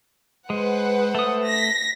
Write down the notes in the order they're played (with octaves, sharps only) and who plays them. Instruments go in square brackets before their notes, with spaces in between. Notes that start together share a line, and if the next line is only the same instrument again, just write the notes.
[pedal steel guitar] G#3 [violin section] B4 C5 F#5
[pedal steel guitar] A3 D#6
[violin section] A#6 B6